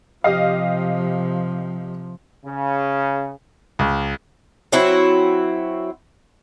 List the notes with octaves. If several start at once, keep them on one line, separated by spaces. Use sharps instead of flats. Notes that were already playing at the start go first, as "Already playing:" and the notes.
C3 F3 G4 D#5 F5
C#3
C#2
F#3 C4 E4 F#4